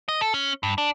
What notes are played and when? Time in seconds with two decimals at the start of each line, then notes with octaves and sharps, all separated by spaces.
0.09 D#5
0.21 A4
0.34 C#4
0.63 G2
0.78 D4